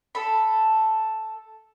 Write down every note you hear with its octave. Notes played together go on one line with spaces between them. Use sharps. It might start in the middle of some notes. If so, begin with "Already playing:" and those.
A4 B5